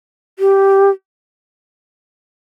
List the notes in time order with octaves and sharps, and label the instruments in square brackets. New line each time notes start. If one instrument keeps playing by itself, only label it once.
[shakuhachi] G4